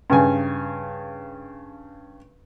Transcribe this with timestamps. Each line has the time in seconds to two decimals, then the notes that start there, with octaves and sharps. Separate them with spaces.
0.10 G2 C#3 G#5